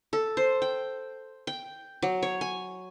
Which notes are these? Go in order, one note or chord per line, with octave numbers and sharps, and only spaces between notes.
A4
C5
G5
G5
F#3
C#5
G#5